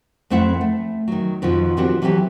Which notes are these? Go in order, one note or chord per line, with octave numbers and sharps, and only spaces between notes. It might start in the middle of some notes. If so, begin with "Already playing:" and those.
F2 A3 C4 E4 E5 F#5
A3
D#3 F#3
F2 B2 D#3 F3
D#3 F3 C4 D4 F#4 G4
E3 F#3 B3 C4 G4 A4